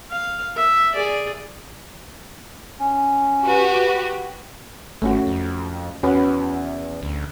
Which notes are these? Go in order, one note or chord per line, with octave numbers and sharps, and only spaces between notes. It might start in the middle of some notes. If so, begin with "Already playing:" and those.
F5
E5
G#4 D5
C#4
F#4 G4 B4
F#5 B5
G#1 A3 C#4 F#4
F2
E2 C#4 F#4 B4
D2